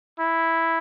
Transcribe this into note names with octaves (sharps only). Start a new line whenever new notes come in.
E4